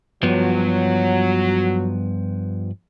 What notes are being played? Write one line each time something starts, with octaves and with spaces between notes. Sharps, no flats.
G2 F3 F#3 B3